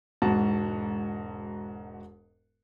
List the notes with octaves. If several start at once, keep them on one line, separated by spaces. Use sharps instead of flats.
E1 G#2 F#4 A5